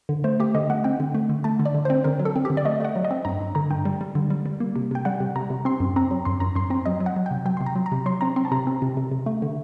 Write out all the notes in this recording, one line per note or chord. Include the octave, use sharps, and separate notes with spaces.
D3
A3 C5
A3 G4
D3 D#5
A3 F#5
C4 G5
D3
A3
D3
A3 A5
D3
D5
D3
C5
C4
D3 A#4
F#3
A4
C4
G4
D3
D5
A3 D#5
A3 F#5
F#3
D#5
C4
G2 A#5
G2
D3 A#5
G2 G5
G3
G3
D3
G3
G3
A#3
C3
C3 G5
G3 F#5
C3
C3 A#5
C3
C4 C6
F#2
C4 A#5
F#3
F#2 C6
F#2 A#5
F#2 C6
C4 A#5
F#3 D#5
F#3
F#5
F#3
G5
C3
F#3 G5
C3 C6
A#5
F#3
A#5
C3
F#3 C6
C4 A#5
C4 C6
A5
C3 A#5
C4
C3
C3
C3
A3
D3